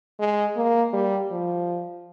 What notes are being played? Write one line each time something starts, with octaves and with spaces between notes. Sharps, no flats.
G#3
A#3
G3
F3